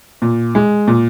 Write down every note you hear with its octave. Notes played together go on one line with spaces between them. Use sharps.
A#2
G#3
A#2